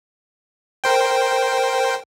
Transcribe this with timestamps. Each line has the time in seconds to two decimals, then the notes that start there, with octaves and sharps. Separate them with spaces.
0.84 A#4 C5 G5